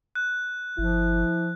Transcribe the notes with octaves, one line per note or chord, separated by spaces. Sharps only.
F#6
G1 F3 E4